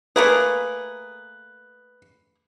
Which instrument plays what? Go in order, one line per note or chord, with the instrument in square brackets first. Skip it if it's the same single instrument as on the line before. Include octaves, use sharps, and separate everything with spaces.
[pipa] A3 A#3 G#4 [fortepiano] B4